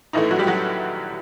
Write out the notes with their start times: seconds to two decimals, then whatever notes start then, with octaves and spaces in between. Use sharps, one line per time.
0.13 A#1 A2 E3 A3 D#4
0.31 F#3 F#4
0.39 G3 G4
0.47 F#3 F#4